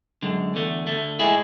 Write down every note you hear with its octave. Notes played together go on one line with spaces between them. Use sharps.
F#2 D3 G#3
E2 D3 A3
D2 D3 A3
A2 G#3 E4 G#4